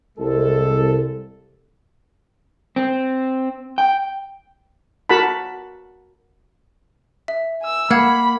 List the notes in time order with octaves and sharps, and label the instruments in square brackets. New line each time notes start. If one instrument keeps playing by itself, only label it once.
[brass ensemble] C2 G#3 A4
[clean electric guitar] C4
G5
[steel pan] F#4 A#4 F#5 A5 B5
[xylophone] E5
[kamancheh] G#5 E6
[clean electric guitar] A#3 [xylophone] F5 F#5 G#6 [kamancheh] B5